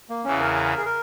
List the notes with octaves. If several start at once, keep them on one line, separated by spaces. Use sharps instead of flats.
A#3
E2 C#3 E3 C#4
A#4
G#4
A#4